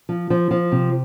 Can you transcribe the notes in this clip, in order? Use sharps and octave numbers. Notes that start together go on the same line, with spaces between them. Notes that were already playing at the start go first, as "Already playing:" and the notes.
F3
F3
F3
C3